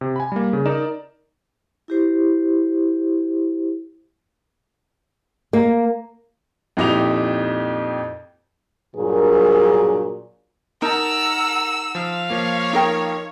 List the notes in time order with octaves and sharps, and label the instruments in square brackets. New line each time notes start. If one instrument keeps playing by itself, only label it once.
[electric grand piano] C3
G#5 B5
G3 A#3
C#3
D#4 A#4 D5 E7
[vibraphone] E4 G4 C5
[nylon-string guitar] A#3
[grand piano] F2 A#2 D#4 E4 G4 F7
[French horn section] G2 A#2 F#3 D4 G#4 A#4
[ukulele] D#4 [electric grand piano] A#4 A5 [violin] F#5 A#5 [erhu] E6
[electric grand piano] F3 [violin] F5
[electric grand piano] F3 A#3 [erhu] C#5
[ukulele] D#4 A#4 G5